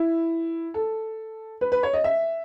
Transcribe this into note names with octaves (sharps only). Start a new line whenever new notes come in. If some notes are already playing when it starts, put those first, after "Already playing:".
Already playing: E4
A4
B4
B4
C#5
D#5
E5